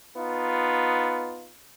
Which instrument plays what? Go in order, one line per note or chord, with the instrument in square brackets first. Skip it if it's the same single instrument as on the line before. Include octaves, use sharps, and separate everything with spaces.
[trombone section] B3 D#4 F4